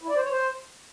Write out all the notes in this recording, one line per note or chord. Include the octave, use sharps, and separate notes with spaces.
E4
D5
C5
C#5
C5